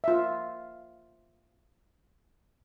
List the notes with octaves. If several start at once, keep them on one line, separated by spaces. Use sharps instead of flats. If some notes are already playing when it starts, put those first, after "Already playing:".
F4 E5